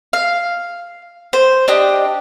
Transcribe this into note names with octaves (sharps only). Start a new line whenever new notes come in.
F5
C5
D4 G4 D#5